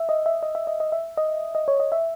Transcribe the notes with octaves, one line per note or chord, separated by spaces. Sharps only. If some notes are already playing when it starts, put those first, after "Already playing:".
Already playing: E5
D#5
E5
D#5
E5
D#5
D#5
E5
D#5
D#5
C#5
D#5
E5